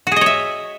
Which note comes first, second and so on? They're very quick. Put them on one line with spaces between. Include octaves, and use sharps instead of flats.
F#4 G#4 D#5 C#5 E5